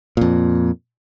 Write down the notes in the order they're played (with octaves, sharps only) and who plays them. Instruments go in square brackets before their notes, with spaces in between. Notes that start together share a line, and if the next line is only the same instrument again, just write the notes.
[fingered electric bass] F2 A#2